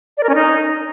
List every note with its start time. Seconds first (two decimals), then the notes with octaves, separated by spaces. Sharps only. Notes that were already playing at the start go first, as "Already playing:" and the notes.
0.17 D5
0.23 A#4
0.29 C#4
0.35 D#4